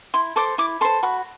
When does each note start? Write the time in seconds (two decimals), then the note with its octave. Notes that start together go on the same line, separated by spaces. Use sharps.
0.14 E4 C6
0.36 A4 C5 D6
0.58 E4 D6
0.81 A4 C6
0.85 C5
1.03 F#4 B5